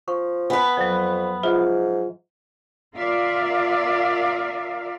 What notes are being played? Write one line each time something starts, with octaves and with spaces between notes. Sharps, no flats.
F3 C#6
B3 B4 G#5
F2 F3 F#3
G#2 F4 E5
F4 A#4 D5 E5 F5